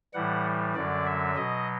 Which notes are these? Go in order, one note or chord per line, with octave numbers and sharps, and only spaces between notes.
A2 E3 G3 F#5
F#2 D3 F#3 D5
E5
B2 F#3 D#5